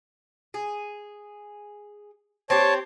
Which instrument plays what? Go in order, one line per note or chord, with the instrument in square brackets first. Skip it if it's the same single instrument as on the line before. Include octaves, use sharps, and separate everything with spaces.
[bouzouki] G#4
[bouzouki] C4 G4 [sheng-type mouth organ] C#5 A5